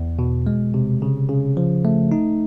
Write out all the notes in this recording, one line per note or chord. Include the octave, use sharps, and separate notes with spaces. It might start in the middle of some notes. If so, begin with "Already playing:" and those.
Already playing: E2
B2
G#3
C3
C#3
C#3
F3
A3
D#4